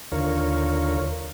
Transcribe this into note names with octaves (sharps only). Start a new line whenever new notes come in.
D#2 D3 F4 A#4 C#5